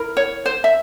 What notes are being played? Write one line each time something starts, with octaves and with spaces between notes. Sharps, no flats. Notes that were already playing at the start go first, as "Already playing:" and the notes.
Already playing: E4 A#4
C#5
C5
E5